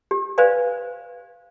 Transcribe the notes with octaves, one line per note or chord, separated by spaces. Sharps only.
G4
B4 C5 D5 F5 G#5